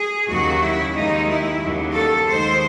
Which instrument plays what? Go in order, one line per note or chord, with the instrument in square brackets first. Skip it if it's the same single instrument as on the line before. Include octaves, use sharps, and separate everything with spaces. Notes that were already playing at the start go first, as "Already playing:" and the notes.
Already playing: [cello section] G#4
D#2 C#3 F#3 F#4
E4
D#2 D#3 G#3 D#4
E4
D#2 C#3 F#3
A4
D#2 D#3 G#3 C5